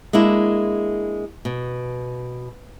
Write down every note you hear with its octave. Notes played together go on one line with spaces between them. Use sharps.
G#3 A#3 D4 E4
B2